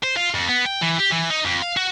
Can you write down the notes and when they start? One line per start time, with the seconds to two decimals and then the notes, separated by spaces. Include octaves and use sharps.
0.03 C5
0.17 F4
0.34 F2
0.49 B3
0.65 G5
0.82 E3
1.00 G4
1.12 E3
1.30 D#4
1.45 F2
1.62 F5
1.77 F#4